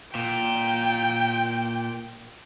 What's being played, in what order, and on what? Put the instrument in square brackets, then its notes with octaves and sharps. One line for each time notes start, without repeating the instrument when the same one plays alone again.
[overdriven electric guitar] A#2 [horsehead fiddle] G5